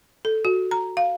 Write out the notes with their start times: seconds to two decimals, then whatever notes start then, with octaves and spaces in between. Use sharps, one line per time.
0.25 A4
0.45 F#4
0.71 A#5
0.97 F5